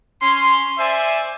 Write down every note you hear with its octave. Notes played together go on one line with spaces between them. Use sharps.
C#4 C6
C5 D5 E5 G#5